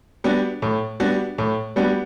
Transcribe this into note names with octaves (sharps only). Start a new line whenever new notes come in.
G3 B3 D4 F#4
A2
G3 B3 D4 F#4
A2
G3 B3 D4 F#4